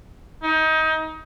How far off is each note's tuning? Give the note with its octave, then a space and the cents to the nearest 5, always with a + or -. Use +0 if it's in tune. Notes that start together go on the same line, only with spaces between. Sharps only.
D#4 +25